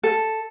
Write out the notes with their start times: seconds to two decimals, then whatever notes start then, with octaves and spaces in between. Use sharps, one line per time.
0.03 A4